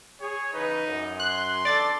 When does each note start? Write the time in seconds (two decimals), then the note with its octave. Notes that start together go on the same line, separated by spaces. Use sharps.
0.21 G#4 C#5
0.53 C#3 E3 D#4 B4
0.85 F#2
1.20 C6 F#6
1.65 E2 D4 A4 D5 A6